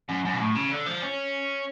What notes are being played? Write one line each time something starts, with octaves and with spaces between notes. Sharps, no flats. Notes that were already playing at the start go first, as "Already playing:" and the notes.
F#2
F#2
B2
A2
C#3
D3
F3
C#4